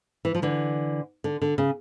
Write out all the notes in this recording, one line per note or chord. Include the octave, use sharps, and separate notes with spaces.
E3
F3
D3 E3
D3
D3
C#3